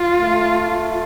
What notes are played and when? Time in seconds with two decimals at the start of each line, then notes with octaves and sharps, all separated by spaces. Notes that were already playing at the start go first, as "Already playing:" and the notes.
Already playing: F4
0.21 A3